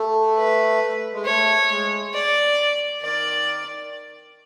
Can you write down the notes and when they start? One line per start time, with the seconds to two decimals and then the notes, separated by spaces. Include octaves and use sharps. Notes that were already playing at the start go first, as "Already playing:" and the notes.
Already playing: A3
0.37 B4
1.14 G#3
1.25 A3 C#5
1.70 G#3
2.14 D5
3.02 D#3 D5